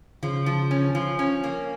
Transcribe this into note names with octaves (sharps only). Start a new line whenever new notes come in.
C#3 F3
F3
C#4
F3
C#4
A#3